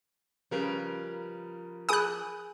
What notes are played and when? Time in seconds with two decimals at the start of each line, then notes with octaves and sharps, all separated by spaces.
0.51 C#3 F3 G3 A#4 B4
1.89 G#4 G#5 B5 D#6 F#6